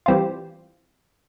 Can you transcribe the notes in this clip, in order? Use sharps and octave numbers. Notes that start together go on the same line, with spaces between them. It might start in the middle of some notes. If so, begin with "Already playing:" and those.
E3 G3 C4 F4